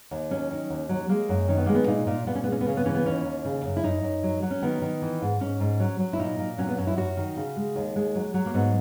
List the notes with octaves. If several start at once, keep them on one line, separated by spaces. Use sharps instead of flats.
D#2
F#3 C#4
D#3
D#2
F#3
G#3 A#3
F#2
D#3 C#4
B3
G#3 A#3
B3
A#2 D#4
A#2
A#2 B3
C#4
G#3 B3
C#4
B3
C#3 C#4
B3
E3 C#4
B3
D#2 C#4
D#2
C#3
F#2
E4
F#2 D#4
F#2
F#3
F#3
C#4
D#3 B3
D#3
E3
G#2
G#2 C#4
G#2
F#3
F#3
E4
A#2 D#4
A#2
F#3 C#4
B3
F#2 C#4
E4
F#2 F#4
D#3
C#3
G#3
D#2
G#3
F#3
F#3
A#3
G#2 B3